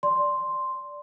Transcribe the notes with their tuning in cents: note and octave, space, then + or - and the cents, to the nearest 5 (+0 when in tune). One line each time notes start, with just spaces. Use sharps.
D5 +0 C6 +0